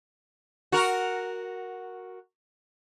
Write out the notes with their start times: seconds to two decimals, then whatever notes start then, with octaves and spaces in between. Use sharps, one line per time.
0.72 F#4 A#4